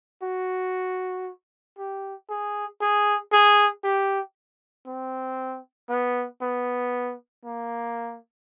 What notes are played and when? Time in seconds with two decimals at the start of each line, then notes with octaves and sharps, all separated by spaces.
0.23 F#4
1.78 G4
2.30 G#4
2.81 G#4
3.32 G#4
3.84 G4
4.87 C4
5.89 B3
6.42 B3
7.45 A#3